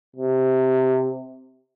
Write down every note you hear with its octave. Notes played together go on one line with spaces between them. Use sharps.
C3